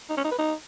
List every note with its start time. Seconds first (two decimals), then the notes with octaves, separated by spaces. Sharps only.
0.10 D#4
0.17 C#4
0.24 D#4
0.31 B4
0.39 D#4